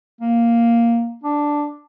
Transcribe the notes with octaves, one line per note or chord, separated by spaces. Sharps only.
A#3
D4